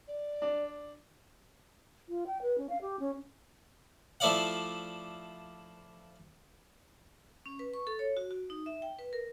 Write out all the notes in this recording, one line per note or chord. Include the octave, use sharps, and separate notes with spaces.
D5
D4
F4
G5
B4
C#4
F5
G4
C#4
F3 A3 E4 D5 F5 F#5
C#4
B4
C#6
A4
C#5
F#4
F#4
D#4
E5
G5
B4
A#4